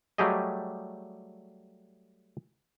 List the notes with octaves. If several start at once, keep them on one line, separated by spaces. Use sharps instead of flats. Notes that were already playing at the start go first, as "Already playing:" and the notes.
F#3 G3 A3 G4 G#4 D#5